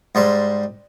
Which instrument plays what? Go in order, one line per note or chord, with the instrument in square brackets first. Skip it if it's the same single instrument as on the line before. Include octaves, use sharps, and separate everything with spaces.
[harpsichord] G#2 G3 C6